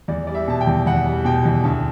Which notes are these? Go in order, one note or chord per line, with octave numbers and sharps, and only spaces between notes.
E2 D5
G3 D5
E5
B2 A5
G5
E2
E2 F#5
G3
B2 G5
E2
D2 A5